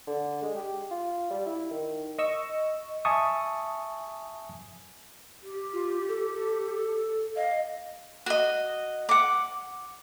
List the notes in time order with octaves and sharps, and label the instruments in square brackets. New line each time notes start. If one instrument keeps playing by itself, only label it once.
[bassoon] D3
G#3
G4
F4
G3
E4
D#3
[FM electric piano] D#5 C#6 E6
[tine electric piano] E5 G#5 A5 C#6 D#6
[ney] G4
[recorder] F4
A4
A4
[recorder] D#5 [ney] F5
[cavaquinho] F#4 D#5
F#5 D6